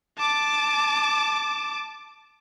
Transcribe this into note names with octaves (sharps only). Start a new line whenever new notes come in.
A5 D6